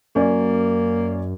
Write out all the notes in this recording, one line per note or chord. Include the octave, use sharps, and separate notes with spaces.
F#2 A#3 C#4 D5